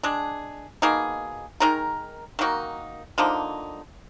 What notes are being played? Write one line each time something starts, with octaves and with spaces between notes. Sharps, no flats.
G#3 D4 G#4
B2 A#3 D#4 G#4
D#3 G#3 D#4 A#4
D#3 A#3 D#4 F#4
D3 F3 A#3 D#4